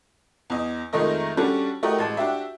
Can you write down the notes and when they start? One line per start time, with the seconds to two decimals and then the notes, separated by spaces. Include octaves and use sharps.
0.50 E2 D#5
0.93 F2 D#3 G#3 A3 A#4 D#5
1.37 G3 C#4 D4 F#4 A4
1.83 A3 E4 F#4 G4 A#4 D#5
1.98 A1 G#3 A5
2.17 D4 F#4 G4 E5